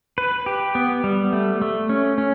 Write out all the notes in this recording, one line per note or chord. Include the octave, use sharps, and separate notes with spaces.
B4
G4
B3
G3
A3
A3
C#4
C#4